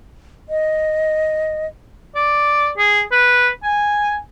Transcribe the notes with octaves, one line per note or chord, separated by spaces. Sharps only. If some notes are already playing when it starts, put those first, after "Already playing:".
D#5
D5
G#4
B4
G#5